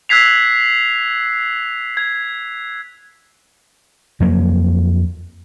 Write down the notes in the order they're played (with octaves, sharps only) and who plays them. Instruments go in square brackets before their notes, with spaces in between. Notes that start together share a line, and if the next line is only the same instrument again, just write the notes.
[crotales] E6 F#6 G#6 B6 C7 F7
G#6
[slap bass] F2 F#3 A#3